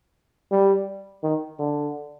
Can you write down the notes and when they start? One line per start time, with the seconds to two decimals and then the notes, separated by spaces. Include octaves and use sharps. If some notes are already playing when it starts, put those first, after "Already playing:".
0.51 G3
1.23 D#3
1.59 D3